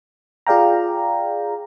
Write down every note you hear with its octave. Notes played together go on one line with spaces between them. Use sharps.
F4 G#4 D5 F5 G5 A#5